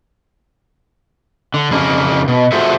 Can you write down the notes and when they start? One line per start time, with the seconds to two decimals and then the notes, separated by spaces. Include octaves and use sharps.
1.54 D3
1.70 F2 C#3 A#3
2.28 B2
2.52 F4 F#4 G#4 A4 C5 E5